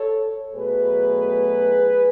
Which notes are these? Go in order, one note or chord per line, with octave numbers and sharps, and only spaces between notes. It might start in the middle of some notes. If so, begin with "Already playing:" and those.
Already playing: A4 C#5
B2 F#3 A3 G#4 B4